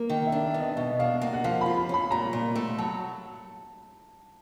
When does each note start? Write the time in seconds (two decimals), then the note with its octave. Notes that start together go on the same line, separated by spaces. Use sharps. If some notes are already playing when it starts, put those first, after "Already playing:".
Already playing: A#3
0.09 D#3 D#5
0.27 E5
0.32 D4
0.44 E5
0.54 B3
0.60 D#5
0.77 B2 E5
0.99 D4 F5
1.22 A#3 F#5
1.34 F#5
1.44 F3 F5
1.61 F4 B5
1.77 B5
1.89 C#4 B5
2.11 A#2 A#5
2.33 A#2
2.56 A3
2.78 F#3 A5